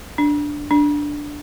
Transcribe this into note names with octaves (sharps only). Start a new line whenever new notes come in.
D4
D4